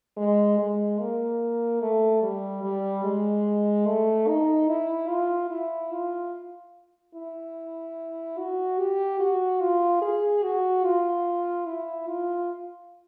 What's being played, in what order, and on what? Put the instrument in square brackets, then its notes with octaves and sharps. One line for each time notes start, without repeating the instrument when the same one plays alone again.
[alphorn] G#3
G#3
A#3
A3
G3
G3
G#3
A3
D#4
E4
F4
E4
F4
E4
F#4
G4
F#4
F4
G#4
F#4
F4
E4
F4